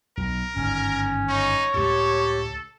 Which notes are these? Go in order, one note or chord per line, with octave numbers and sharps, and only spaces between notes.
B1 A#4
G1 G#2 D#3 C#4
D#4 C#5
C#2 A2 G4 A4